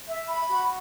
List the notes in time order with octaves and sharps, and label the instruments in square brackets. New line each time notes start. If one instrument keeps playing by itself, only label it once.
[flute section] E5
B5
F#4